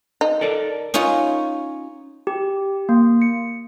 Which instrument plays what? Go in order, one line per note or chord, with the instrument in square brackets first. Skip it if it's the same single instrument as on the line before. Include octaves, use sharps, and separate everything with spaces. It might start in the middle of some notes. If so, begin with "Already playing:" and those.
[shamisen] D#4
[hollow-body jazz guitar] A4 A#4 D5
[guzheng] C#4 D#4 F4 C#5
[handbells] G4
A#3
C#7